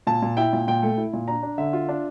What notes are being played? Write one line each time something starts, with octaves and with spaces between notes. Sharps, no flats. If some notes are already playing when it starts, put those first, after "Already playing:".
A#2 A5
A#2
E4 G5
A#2
A#2 G5
A3
E4
A#2
D4 A#5
D4
D3 E5
F4
D4